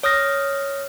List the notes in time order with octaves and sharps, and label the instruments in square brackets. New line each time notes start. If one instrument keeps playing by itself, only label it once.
[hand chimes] C#5 D#6 F6 A#6